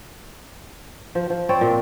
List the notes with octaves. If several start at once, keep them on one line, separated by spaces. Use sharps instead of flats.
F3
F3
C4 C#5 D5
A#2